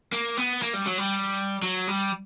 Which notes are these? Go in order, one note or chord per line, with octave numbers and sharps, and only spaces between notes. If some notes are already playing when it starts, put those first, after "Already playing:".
A#3
B3
A#3
G3
F#3
G3
F#3
G3